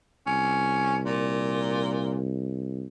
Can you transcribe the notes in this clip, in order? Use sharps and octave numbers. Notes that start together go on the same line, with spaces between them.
C2 C#4
A#2